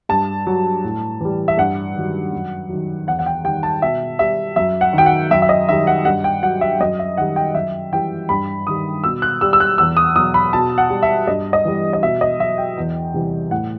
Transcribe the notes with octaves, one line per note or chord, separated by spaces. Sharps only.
G2 A5
F#3
A2
E3 G3
E5
G2 F#5
D#3 F#3
F#2
D#3 F#3
E2 F#5
F#5
G5
D#3 G3 G5
A5
B2 E5
G3 E5
F#2 E5
F#5
D#3
F#3 G5
F#5
F#2 E5
E5
D#5
D#3 G3 E5
F#5
G2 F#5
G5
F#3 F#5
E5
F#2 D#5
E5
D#3 G3 F#5
G5
F#2 E5
E3 G3 G5
G2 B5
D#3 G3 D#6
B2 E6
F#6
G3 E6
E6
F#6
E2 E6
D#6
B2 F#3 D#6
B5
B2 A5
F#5
G3
E5
G2 D#5
D#5
E3 G3
D#5
B2 E5
D#5
F#3 E5
G5
E2
C3 E3 G3
A2 F#5